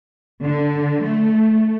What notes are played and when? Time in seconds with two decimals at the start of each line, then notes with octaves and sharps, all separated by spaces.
0.44 D3
1.04 A3